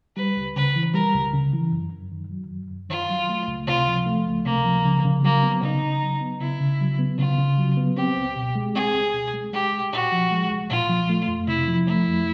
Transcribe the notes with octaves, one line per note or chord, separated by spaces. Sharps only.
G3 B4
C#2
C#3 B4
E3
G3 A#4
C#2
C#3
E3
F#2
F#2
D#3
F#3
F#2
F#2
D#3 F4
F#3
A3
C#2
C3 F4
F3
A3
C#2
C3 A#3
F3
C#3
C#3
F#3 A#3
B3
C#3 D#4
C#3
F#3
B3
C#3 E4
C#3
F#3
B3
C#3 F4
C#3
F#3
B3
C4 G4
C#2
B2
G#3
C4 G#4
C#2
B2
G#3
G#3 G4
C2
A#2 F#4
F3
G#3
C2
A#2 F4
F3
A3
F2
C3 E4
F3
A3 E4
F2